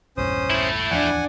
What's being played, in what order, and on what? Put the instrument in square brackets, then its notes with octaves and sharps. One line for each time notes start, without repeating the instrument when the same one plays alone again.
[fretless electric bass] A#1 E2 G2 [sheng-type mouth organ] C#4 C5 D#6
[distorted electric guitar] A3 E4
[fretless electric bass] D1 E2 F3 [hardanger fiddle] D4 [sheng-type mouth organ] F#5 G#5